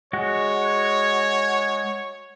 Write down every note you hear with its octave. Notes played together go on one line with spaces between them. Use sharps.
G#3 F#4 C#5